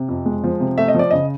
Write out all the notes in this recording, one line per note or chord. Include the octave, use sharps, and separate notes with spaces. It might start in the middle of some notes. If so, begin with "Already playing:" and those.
Already playing: C3
F2
G#3
F3
C3
A3 E5
D#5
F3 D5
C#3 D#5